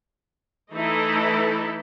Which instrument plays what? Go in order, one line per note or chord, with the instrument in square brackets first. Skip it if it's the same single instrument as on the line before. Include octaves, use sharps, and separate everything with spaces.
[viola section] E3 A3 D#4 E4 A4